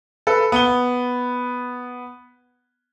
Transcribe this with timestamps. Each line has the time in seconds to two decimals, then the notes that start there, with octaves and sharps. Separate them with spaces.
0.27 A4 B4
0.52 B3 G7